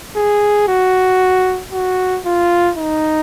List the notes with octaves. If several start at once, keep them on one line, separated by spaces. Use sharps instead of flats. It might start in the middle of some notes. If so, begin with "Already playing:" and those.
G#4
F#4
F#4
F4
D#4